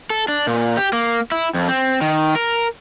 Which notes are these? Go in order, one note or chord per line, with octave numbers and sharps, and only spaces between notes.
A4
D4
A#2
G4
A#3
E4
F2
C4
D#3
A#4